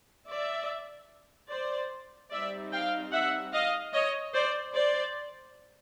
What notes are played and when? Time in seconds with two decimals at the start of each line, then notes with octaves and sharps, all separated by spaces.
0.28 D5 E5
1.50 C5 D5
2.31 G3 C4 D#4 D5 E5
2.72 F5 G5
3.12 E5 F#5
3.53 D#5 F5
3.93 C#5 D#5
4.34 C5 D5
4.74 C5 D5